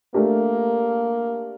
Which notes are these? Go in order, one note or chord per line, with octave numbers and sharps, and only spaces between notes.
A3 A#3 D4 G4 A#4